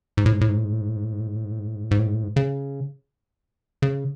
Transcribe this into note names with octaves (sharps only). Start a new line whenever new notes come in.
G#2
A2
G#2
A2
G#2
A2
G#2
A2
G#2
A2
G#2
A2
G#2
A2
G#2
A2
G#2
A2
G#2
A2
G#2
A2
G#2
A2
G#2
A2
G#2
C#3
C#3